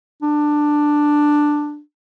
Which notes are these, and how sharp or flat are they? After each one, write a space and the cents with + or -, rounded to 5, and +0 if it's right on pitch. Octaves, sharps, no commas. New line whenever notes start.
D4 +10